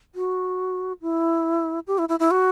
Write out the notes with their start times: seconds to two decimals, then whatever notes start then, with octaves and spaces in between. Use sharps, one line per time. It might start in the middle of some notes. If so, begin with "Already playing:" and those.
0.15 F#4
1.02 E4
1.87 G4
1.98 E4
2.09 E4
2.20 E4
2.31 F#4